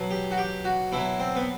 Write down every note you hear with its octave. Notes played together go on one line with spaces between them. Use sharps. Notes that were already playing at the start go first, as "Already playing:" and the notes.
Already playing: B2 F#3
G4
F#4
G4
F#4
B2 F#3 E4
C4
B3